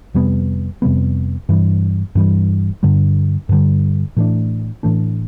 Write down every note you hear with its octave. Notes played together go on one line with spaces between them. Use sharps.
F2 C3 G3 B3
F2 C3 G3 B3
G2 E3 G3
G2 E3 G3
G2 D3 G3
G2 D3 G3
A2 E3 A3 D4
A2 E3 A3 D4